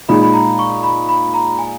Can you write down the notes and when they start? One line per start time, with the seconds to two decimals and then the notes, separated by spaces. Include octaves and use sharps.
0.09 A#2 G#3 D#4 B5
0.23 B5
0.34 A#5
0.59 C#6
0.83 B5
1.09 B5
1.34 A#5
1.59 G#5